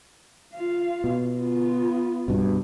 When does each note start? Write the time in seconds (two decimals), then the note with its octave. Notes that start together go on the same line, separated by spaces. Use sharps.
0.55 F4 F5
1.04 B2
1.40 B3 F4
2.28 C2 G2 B2